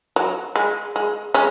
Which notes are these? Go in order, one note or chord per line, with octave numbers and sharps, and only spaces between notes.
F#3
G#3
G#3
G#3 C#4